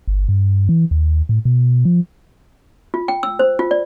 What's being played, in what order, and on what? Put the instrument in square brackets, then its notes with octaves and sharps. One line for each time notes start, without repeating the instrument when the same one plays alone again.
[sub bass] G1
G2
E3
D#2
A2
B2
F3
[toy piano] F4
G5
E6
C5
F4
D5